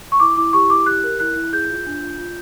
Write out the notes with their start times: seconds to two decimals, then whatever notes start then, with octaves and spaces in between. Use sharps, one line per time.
0.12 C#6
0.20 E4 D6
0.37 E4 D6
0.53 G4 C#6
0.70 E4 D6
0.86 G4 F#6
1.04 A#4
1.20 E4 F#6
1.36 E4
1.53 G#4 G6
1.70 F4
1.86 D4
2.02 F4
2.19 F4